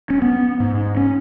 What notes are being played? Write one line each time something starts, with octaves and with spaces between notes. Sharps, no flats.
C#4
B3
G#2
C#4